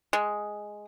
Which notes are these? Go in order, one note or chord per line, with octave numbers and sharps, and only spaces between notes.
G#3